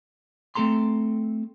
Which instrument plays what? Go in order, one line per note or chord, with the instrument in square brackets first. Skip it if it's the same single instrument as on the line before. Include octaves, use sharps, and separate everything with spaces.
[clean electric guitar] A3 C4 A4 A#5 C6